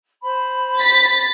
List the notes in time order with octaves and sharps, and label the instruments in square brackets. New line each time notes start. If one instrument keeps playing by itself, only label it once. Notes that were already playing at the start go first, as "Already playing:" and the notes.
[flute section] C5 B5
[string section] A6 B6